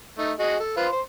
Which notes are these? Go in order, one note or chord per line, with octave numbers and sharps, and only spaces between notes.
A3 D#4
F#4 G#4 D#5
A4
F4 B4 C5
C5